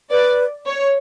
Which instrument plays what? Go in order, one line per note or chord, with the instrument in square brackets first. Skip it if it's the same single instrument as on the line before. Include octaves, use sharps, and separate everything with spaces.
[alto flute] B4 [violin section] D5
[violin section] C#5